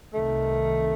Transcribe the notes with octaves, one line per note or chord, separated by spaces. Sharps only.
C2 C3 D#3 A3